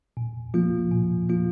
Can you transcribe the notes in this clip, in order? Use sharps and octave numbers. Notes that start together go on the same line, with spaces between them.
A#2
F3 A#3 F4
A#2
F3 A#3 F4